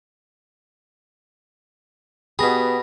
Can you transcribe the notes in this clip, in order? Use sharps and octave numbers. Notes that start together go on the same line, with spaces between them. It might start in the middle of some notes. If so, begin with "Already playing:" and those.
B2 B3 G4 G#4 B5 A#6